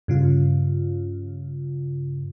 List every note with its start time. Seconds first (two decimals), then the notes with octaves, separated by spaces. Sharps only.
0.08 G2 C#3 F4